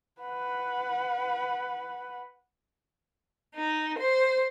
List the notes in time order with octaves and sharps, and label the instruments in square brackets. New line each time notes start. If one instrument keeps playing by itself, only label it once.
[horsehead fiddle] B4 F#5
[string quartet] D#4
C5